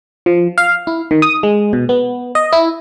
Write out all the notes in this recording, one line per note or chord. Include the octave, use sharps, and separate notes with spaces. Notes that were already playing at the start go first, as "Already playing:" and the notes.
F3
F5
E4
D#3
D#6
G#3
B2
B3
D#5
E4